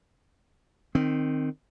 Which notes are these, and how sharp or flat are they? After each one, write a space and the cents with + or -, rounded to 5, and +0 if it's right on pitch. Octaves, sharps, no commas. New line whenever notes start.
D#3 -15 C4 +0